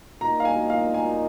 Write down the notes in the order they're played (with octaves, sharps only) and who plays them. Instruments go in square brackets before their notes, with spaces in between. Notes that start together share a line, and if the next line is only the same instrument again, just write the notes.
[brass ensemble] A#2 A#3 D#4 [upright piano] A#5
[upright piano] F5
G#5
F5
G#5